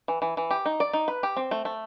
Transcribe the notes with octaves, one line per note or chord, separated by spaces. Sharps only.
E3
E3
E3
G4
D#4
D5
D#4
B4
G4
C4
A3
A3